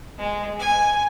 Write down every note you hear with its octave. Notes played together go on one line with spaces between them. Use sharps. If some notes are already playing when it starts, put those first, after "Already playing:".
G#3
G#5